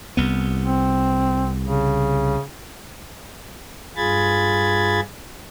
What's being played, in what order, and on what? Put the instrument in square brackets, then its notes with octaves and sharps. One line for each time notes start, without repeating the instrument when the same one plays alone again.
[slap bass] C2 B3
[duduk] C4
C#3
[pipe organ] G2 F4 G#4 B5 G#6 A6